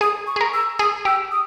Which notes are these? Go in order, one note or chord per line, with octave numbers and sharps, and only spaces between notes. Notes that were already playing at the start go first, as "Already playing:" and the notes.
G#4 D#6
C#6
G#4
A#4
E6
G#4 D#6
G4 E6
D#6